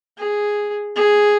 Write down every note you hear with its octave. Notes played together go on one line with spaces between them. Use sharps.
G#4
G#4